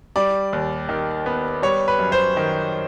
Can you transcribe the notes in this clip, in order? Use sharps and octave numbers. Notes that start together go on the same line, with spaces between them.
G3 D5
D#2
D#3
B3
G3 C#5
B4
F#2
C5
D#3